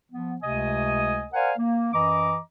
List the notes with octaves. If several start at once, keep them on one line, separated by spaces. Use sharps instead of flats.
F3 B3
C#2 C3 A3 D#5 G#5 D#6
A#4 C5 D5 F5 F#5 G#5
A#3
F#2 E3 D#5 A#5 D6